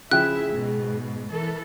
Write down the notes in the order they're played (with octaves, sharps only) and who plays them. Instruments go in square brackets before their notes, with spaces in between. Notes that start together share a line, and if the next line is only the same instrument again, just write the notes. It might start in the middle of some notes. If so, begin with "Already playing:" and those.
[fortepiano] C#3 F3 G5 [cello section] E4 E5 [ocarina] G#4 [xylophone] F#6
[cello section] G#2 B2
[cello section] E3 A4 [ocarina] A#4